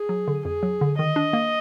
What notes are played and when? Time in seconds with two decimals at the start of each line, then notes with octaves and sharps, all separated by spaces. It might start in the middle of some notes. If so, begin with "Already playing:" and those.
Already playing: G#4
0.09 F#3
0.28 D3
0.45 F2 G#4
0.63 F#3
0.81 D3
0.98 D#3 D#5
1.16 D4
1.33 A#3